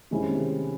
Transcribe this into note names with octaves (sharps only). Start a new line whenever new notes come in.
C3 D#3 G#3 C#4 E4